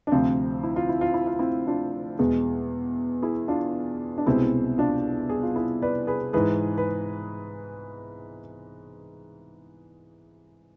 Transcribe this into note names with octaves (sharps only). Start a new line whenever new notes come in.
D4
D2 C3 F3 C4
E4
F4
E4
F4
E4
F4
C4 E4
D4 F4
E2 B2 G#3
E4 G#4
D4 F4
D4
C2 B2 G#3 C4 E4
D4 F4
G#4
F4
E4 G#4
B4 D5
G#4 B4
G#2 E3 G#3 G#4 B4
B4